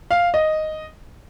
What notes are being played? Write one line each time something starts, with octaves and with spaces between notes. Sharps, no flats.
F5
D#5